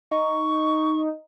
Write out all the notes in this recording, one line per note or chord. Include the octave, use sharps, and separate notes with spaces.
D#4 C#6